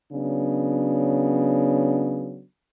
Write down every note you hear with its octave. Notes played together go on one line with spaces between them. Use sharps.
C#3 F#3 B3 D4